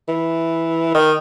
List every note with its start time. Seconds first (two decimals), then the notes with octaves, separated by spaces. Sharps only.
0.08 E3
0.95 D#3